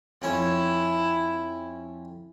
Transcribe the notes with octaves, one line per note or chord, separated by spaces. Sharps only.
F2 C#4 E4 C#5